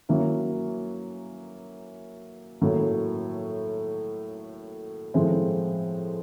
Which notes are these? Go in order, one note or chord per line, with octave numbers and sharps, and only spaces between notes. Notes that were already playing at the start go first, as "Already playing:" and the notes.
F#3 A#3 C#4 E4
A2 F#3 A#3
A2 F3 G#3 C4 E4